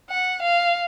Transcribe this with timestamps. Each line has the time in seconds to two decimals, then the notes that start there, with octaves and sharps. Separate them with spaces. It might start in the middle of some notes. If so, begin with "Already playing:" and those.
0.10 F#5
0.43 F5